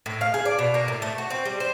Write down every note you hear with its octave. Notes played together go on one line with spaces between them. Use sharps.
A2
F5
G#4
D5
B2
A#3
A2
A3
F#4
C4
G3
C5